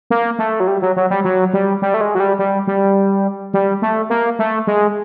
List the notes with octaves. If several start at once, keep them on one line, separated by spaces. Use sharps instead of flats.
A#3
A3
F#3
G3
F#3
F#3
G3
F#3
G3
G3
A3
G#3
F#3
G3
G3
G3
G3
A3
A#3
A3
G#3